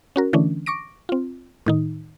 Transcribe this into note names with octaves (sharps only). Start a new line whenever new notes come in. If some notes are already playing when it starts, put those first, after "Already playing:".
C#4 F#4 A#4
D3 E3 A3 C#4 D4
C#6 D6 A#6 D7
C4 F4
A2 D#3 D#4